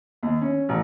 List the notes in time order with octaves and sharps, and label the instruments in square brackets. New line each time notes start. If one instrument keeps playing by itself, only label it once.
[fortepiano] D#2
C#4
A1